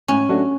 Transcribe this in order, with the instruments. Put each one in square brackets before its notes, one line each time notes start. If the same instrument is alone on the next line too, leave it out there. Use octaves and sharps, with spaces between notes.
[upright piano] A2 [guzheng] C#4
[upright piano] F#3 A3 D4 F#4